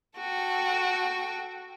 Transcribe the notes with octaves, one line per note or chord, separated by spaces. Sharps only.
F#4 A4 G5